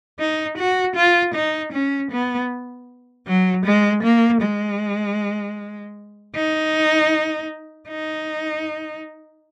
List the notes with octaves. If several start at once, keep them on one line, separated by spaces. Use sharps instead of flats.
D#4
F#4
F4
D#4
C#4
B3
F#3
G#3
A#3
G#3
D#4
D#4